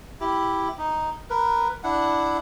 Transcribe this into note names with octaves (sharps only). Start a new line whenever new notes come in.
E4 G4
D#4
A#4 B4
D4 E4 F#5